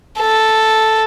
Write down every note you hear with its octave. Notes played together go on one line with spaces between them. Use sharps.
A4